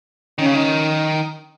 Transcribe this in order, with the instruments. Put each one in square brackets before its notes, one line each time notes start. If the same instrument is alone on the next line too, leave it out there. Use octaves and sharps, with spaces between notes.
[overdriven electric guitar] D#3 [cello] C#4
[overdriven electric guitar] C#3
D#3